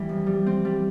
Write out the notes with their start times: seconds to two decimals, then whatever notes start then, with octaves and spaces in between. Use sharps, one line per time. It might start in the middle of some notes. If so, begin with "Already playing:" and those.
Already playing: E3 G3
0.09 F2
0.27 G3
0.46 C4
0.65 G3